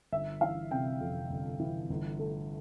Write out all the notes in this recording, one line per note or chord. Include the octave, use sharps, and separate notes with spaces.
G1 E5
E3 F5
C3 G5
F2
G1
E3
G1
A3